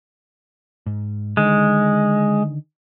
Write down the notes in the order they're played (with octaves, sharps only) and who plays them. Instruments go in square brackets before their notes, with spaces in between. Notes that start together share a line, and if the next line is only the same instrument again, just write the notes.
[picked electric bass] G#2
[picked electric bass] D3 D#3 [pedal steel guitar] G#3